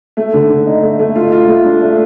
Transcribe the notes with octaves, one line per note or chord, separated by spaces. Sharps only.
A3
D3
D3
D#4
A3
A3
F4
F4
A3
D4
A3